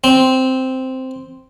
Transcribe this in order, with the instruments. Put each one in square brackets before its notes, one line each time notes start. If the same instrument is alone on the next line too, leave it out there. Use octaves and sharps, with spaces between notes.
[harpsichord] C4